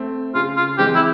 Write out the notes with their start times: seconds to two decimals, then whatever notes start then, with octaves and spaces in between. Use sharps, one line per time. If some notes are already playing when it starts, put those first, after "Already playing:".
Already playing: A3 C4
0.35 C#3 F4
0.57 F4
0.78 E3 G#3 C4 G4
0.95 E4